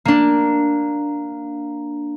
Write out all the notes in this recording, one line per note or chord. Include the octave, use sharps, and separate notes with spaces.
A#3 D4